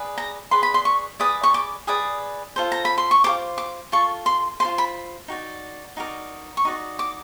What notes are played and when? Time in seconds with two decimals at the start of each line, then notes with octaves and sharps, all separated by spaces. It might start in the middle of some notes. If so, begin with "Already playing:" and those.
Already playing: G#4 B4 D5
0.18 A#5
0.51 G#4 B4 D5 C6
0.63 B5
0.74 C6
0.85 C#6
1.20 G#4 B4 D5 D#6
1.43 C#6
1.54 D6
1.87 G#4 B4 D5 D#6
2.56 F4 A4 C5
2.72 A#5
2.85 B5
2.98 C6
3.11 C#6
3.24 F4 A4 C5 D6
3.58 D6
3.92 F4 A4 C#6
4.26 C6
4.60 A4 C5 C6
4.65 F4
4.78 B5
5.28 D#4 F#4 D5
5.97 D#4 F#4 A#4 D5
6.57 C#6
6.65 D#4 F#4 D5
6.99 D6